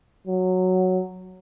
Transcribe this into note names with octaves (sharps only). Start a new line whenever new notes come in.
F#3